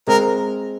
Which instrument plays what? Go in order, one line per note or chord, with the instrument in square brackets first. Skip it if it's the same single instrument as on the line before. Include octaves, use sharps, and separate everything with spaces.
[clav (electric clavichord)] G#3 C4 [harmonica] A#4